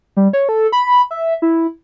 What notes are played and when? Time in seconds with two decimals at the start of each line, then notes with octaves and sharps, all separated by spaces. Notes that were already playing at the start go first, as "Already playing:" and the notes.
0.17 G3
0.33 C#5
0.49 A4
0.72 B5
1.11 E5
1.42 E4